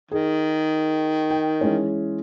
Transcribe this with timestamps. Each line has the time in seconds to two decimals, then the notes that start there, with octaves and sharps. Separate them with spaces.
0.11 D#3 G#4
1.31 G5
1.61 E3 G#3 C#4